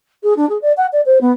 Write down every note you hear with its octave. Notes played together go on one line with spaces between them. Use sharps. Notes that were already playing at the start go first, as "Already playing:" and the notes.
G#4
D4
G#4
D5
F#5
D5
C5
B3